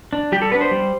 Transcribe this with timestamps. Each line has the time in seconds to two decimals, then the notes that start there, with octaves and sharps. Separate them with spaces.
0.13 D4
0.32 G3 G4
0.42 A4
0.51 B3 D4 B4
0.61 C5
0.71 G3